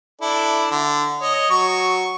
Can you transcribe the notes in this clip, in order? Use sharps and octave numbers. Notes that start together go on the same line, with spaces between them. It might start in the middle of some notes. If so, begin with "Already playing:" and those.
D4 E4 A4
D3
C#5 D#5
F#3 C#6